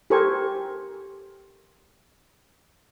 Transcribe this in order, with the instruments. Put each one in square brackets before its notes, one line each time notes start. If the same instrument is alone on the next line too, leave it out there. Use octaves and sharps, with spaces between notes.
[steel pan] G4 A4 A#4 C5 G#5 C#6